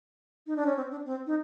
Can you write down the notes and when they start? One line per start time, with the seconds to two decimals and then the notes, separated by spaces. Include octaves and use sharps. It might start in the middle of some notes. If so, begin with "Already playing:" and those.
0.47 D#4
0.56 D4
0.66 C#4
0.77 C4
0.91 D4
1.06 C4
1.27 D#4